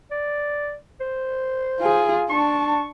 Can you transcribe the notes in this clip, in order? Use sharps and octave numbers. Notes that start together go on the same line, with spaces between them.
D5
C5
F4 G#4
D4 A5 C#6